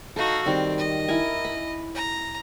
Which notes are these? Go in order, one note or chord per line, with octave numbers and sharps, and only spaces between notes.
D#4 F#4 A4 F5
D#3 G3 C4
D#5
E4 A#4 G#5
B5
A#5